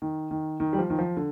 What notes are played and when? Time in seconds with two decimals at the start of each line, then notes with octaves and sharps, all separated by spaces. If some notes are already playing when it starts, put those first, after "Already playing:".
0.02 D#3
0.31 D#3
0.60 D#3
0.73 G3
0.78 F3
0.90 D#3
0.99 F3
1.17 D3